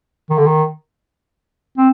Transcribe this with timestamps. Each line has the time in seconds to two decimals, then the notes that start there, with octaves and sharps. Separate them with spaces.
0.30 D#3
0.38 D3
0.46 D#3
1.78 C4